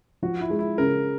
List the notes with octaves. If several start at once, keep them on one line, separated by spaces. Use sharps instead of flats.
F3 F#4
E4
G#3
E4
C#3 A#4